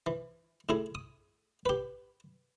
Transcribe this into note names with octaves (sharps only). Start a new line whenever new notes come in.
E3
A2 E4 G#4
D#6
G4 B4